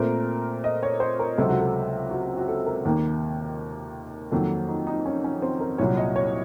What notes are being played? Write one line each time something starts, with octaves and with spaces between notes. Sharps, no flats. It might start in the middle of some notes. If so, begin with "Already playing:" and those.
Already playing: A#2 A3 C4 A#4
D#5
C#5
C5
A#4
C#2 C3 F#3 C4 A4
F#4
A4
F#4
F#4
A4
A#4
D#2 D#3 A#3
F2 D#3 F#3 A#3 A4
D#4
D#4
C#4
C#4
C4
A#4
C2 A#2 F#3 C#5
D#5
C#5